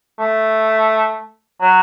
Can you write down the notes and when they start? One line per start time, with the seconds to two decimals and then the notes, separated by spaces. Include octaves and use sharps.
0.20 A3
1.61 F#3